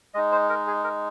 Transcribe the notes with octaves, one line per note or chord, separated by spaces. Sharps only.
G#3 D#4 D#5
C5
A#4
G#4
A#4